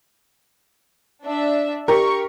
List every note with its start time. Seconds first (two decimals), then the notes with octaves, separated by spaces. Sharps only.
1.25 D4 E5
1.88 G4 A#4 C#6